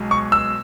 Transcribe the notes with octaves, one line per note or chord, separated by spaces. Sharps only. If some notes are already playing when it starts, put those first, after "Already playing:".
Already playing: B1 B2 G#3
C#6
E6